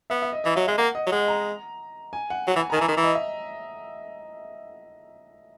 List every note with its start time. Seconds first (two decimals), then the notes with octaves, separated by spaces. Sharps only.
0.10 B3 E5
0.22 E5
0.33 D#5
0.44 E3 D#5
0.55 F#3 E5
0.67 G#3 E5
0.78 A#3 F#5
0.95 D#5
1.07 F#3
1.12 G#3 F#5
1.28 A#5
2.13 G#5
2.30 F#5
2.47 F#3 F#5
2.56 E3
2.59 G#5
2.70 A#5
2.73 D#3
2.77 G#5
2.81 E3 A#5
2.88 D#3
2.92 E3 A#5
3.04 D#5
3.15 E5